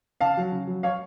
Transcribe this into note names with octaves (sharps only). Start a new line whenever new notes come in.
C#3 F5 A5
F#3
C#3
F#3
C#5 F5